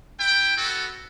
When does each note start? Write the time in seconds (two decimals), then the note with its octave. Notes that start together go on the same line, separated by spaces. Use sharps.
0.20 E4 G5
0.57 B3 F#4 A4